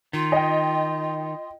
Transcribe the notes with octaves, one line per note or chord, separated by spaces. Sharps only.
D#3 F4
D#5 G5